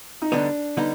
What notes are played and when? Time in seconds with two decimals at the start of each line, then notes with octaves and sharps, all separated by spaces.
0.22 D#4
0.32 D2 D3 G3 B3 D4 D#4
0.77 D3 G3 B3 D#4